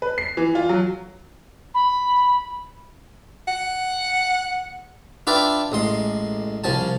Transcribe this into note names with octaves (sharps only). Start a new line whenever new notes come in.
B4
C7
E3
F4
F#3
B5
F#5
D4 F4 B4 D5 E5 G5
A1 G#3 C6
C2 F3 G#5 A5